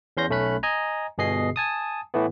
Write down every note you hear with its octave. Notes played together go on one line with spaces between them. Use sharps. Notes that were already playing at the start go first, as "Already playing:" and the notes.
E2 C#4 C6 G6 A#6
B1 A3 C#4 B5 F#6
D#5 G#5 A#5
G1 B2 G#4 D#5 C7
G#5 A5 D#6
A2 E3 A3 B3